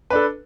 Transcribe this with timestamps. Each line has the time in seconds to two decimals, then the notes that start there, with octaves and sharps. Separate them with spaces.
0.10 B4
0.13 D4
0.15 A4